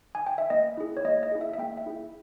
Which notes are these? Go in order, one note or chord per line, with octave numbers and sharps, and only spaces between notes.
G#5
G5
E5
A#3 D#5
E4 G#4
C#5
A#3 D#5
D#5
E4 G#4
E5
E5
A#3 G5
E5
E4 G#4